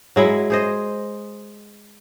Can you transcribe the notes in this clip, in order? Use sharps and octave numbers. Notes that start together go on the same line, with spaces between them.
F#3 G#3 E4
G#4 C5 D#5